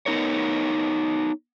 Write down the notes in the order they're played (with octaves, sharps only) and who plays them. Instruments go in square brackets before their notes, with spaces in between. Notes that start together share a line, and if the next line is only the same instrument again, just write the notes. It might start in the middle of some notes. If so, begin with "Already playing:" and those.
[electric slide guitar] B3 D#4 A#4 C#5